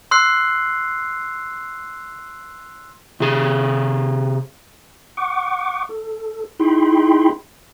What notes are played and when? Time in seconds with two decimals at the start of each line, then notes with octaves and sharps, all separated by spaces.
0.11 C6 E6 F#6 C7
3.20 C3 G#4
5.17 F#5 C#6 D6
5.89 A4
6.59 D#4 E4 G#4 G5 B5 C6